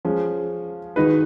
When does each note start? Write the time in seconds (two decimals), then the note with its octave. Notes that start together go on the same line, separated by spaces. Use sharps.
0.05 F3 G#3 C#4
0.96 D#3 G#3 D#4 F#4 B4